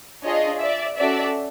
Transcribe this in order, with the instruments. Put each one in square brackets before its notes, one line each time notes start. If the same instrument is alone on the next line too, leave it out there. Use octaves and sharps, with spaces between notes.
[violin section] D4 F4 G#4 C#5 D#5
D5 E5
C#4 F#4 A4 D5 E5